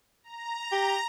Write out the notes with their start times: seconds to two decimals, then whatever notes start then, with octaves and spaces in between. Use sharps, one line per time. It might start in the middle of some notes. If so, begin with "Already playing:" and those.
0.24 A#5
0.72 G4